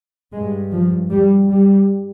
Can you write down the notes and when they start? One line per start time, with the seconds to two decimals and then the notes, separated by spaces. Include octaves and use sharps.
0.33 G2 G#3
0.72 F3
1.09 G2 G3
1.48 G3